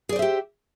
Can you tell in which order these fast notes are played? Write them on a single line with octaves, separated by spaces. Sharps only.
G#4 D5 C5 E5 G4